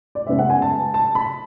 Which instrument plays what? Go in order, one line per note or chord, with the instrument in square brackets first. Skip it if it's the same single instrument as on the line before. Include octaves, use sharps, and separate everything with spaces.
[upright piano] D5
F#2 C#3 G#3 B3 E5
F#5
G#5
A5
A5
B5